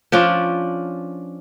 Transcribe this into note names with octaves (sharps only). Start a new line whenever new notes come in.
F3 C#4 D4 F4